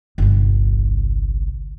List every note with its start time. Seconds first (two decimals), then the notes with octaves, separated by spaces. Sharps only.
0.18 G1 C2